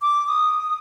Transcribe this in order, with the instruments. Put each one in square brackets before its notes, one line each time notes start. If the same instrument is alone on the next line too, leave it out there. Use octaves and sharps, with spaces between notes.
[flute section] D6
D#6